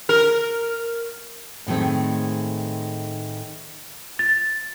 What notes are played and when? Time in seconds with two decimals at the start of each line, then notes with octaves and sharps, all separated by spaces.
0.09 A#4
1.67 A2 D#3 G#3 A3 C4
4.19 A6